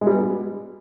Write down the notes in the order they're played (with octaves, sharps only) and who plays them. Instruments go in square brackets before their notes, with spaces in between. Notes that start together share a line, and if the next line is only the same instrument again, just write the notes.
[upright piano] G#3
G3
B3
F#4